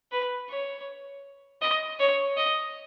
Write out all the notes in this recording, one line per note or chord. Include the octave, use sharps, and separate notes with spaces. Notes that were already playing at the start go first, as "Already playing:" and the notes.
B4
C#5
D#5
C#5
D#5